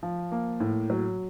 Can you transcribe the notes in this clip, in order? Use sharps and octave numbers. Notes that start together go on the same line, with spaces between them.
F3
A#3
A2
F#3